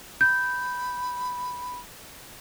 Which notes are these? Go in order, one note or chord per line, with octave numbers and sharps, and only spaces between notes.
B5 G6